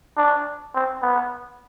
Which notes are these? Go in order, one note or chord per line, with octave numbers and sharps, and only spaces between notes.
D4
C4
B3